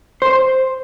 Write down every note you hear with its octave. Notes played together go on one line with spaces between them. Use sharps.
C5